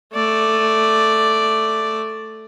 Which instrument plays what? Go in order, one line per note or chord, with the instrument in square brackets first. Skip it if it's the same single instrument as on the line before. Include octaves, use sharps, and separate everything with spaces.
[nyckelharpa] A3 D5